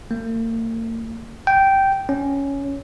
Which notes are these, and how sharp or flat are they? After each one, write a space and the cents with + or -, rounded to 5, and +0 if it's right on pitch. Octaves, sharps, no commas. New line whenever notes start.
A#3 -45
G5 -10
C#4 +5